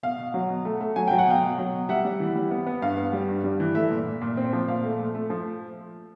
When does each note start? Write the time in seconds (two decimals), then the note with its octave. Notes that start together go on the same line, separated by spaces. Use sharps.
0.03 B2 F5
0.18 B2
0.34 F#3
0.49 B2
0.65 A3
0.81 A3
0.96 F#3 G#5
1.08 F#3 G5
1.19 F#5
1.27 B2 F5 G5
1.43 B2
1.58 F#3
1.73 B2
1.89 G3 E5 F#5
2.05 G3
2.20 E3
2.36 G3
2.51 B3
2.66 B3
2.82 G2 F5
2.97 B3
3.13 G3
3.29 G2
3.44 G3
3.60 E3
3.75 A3 E5
3.91 A#2
4.06 A#2
4.22 A#2
4.37 C4
4.53 F3
4.68 A#2 F5
4.84 A3
4.99 A3
5.15 A3
5.30 F3